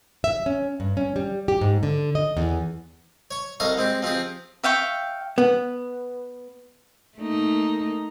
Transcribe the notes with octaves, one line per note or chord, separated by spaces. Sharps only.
E5
C#4
G2
C#4
G3
G4
G#2
D3
D#5
E2
C#5 C#6
C2 A4 D#5 F5 C#6
G#3 C4 G4
F3 C4 G4 G#4
E5 F5 G5 C#6
B3
A3 A#3 D#4